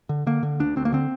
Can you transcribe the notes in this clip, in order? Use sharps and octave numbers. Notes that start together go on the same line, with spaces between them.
D3
D3 A#3
D3
D2 D4
D2 C4
A#3
D3 C4